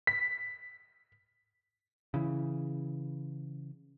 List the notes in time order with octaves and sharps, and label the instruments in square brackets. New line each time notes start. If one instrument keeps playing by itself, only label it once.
[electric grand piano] B6
[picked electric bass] C#3 E3